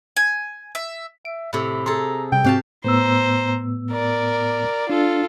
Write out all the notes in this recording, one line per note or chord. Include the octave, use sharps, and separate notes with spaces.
G#5
E5
E5 D7
A2 C3 B5
G#4 A4 A#5 C6
C3 G3 G5
G#2 C4 F#4 G4 F5 A5
A2 B3 C5 A#5 E6
A#4 D5
D4 F4 A4